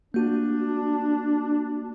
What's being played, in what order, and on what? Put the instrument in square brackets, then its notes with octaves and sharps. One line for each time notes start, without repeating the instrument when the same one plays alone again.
[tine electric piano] A#3 F#4 [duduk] D4